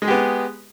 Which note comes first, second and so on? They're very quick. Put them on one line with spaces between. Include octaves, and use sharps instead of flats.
G#3 G#4 G4 B3